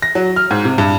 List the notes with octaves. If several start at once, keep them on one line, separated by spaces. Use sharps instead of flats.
A#6
F#3
F6
G#2
C3
G2